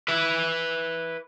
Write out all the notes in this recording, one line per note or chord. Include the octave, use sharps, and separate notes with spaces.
B4 E5